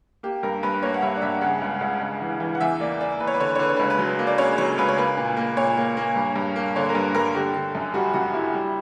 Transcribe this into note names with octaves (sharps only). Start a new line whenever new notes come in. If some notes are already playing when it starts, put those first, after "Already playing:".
A#3 G4
G2 A#4
G2 B4
B4
A#3 C#5
F#5
G2 E5
D5
G2 E5
C#3 F#5
C#2
C#2
C#2
E3
E3
F#5
E2 E5
A#3 D5
A#3 D5
E2 B4
C#5
B4
D3 C#5
B4
C#5
D3 B4
C#5
B4
C#2 C#5
B4
F#3
A#3
D5
C#3 C#5
F#3 C#5
C#2 B4
C#5
A#3 B4
A#2
A#3
A#2 C#5
A#3
A#3
G2
G2
A#3
D3 C#5
A#4
G2 B4
G2 A#4
D3 G4
D3
F#2
G3 F#4
F#2 F#4
G3 E4
G3